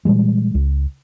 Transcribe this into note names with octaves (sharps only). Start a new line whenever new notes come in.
A#2 E3 G3 G#3
C#2